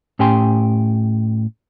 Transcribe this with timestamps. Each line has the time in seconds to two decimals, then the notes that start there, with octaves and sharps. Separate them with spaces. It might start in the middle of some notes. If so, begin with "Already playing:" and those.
0.19 A2 C#4 G4 G5 G#5 C6